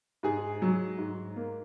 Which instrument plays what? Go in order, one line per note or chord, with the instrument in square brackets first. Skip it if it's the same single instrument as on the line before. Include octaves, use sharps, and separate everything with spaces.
[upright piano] G#2 G#4
F#3
G#2
A#3